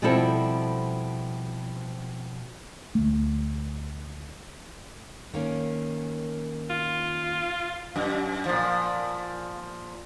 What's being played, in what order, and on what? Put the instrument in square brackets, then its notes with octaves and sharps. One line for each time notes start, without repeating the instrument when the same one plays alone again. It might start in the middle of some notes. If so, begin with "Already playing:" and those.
[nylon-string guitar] B2 F3 G3 C4 E4 A4
[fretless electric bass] D2 A3
[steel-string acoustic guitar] D#3 A#3 C#4
[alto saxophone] F4
[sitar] F#2
A#2 F3